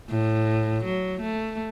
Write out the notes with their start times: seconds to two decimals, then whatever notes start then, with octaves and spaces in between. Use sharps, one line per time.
0.09 A2
0.84 F#3
1.21 A3